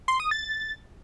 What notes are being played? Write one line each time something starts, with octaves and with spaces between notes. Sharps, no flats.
C6
D#6
A6